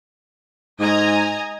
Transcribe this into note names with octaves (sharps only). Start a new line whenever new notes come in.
G#2 D#5 G#5 A#5